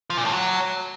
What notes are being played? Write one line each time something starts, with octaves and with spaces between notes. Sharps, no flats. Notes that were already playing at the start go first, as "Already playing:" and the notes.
F3
A#2
A2
F#3